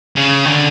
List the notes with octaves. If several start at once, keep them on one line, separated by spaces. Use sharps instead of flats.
C#3
D3